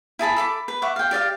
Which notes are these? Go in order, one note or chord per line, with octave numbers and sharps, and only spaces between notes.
E4 G#4 A5 B5
A4 B5 D6
B4
E5 F#5 C#6 D6
F5 G5
G4 D5 D#5 F5